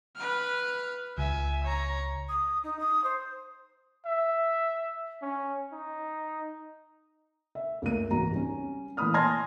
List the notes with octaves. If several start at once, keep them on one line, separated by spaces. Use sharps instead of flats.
B4 F6
C#2 E5 G#5
C#5 A#5
D#6
D#4
D#6
C5
E5
C#4
D#4
E5
C#2 A3 A#3 D#7
E2 G#2 F#4 A#5
G3 C#4
A#2 E3 A3 B5 D#6 F6
G#5 A5 C6 F6 G#6 A#6